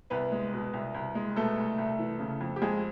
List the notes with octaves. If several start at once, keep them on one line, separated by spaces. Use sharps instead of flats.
C2 B3 B4
G#3
B2
C2
C2
G#3
B2 A3 A4
C2
C2
E3
C#3
F2
G4
F2 G#3 G#4